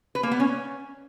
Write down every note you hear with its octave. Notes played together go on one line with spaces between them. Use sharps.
B4
A#3
B3
C#4